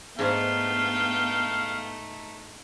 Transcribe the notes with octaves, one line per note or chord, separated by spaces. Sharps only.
G#2 A3 B3 D4 D#4 F5 G5